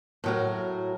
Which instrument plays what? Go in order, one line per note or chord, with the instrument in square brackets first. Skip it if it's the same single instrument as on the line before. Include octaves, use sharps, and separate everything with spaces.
[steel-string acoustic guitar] A2 F#3 A#4